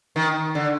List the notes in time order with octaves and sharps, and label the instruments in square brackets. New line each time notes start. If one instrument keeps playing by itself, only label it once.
[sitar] D#3
D3